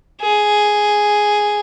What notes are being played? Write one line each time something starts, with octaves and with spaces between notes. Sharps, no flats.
G#4